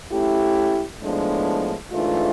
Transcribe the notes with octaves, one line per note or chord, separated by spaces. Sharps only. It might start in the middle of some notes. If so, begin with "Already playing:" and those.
A3 C#4 E4 G4
A2 F3 G#3 B3 D4
G#2 E3 A3 D4 F4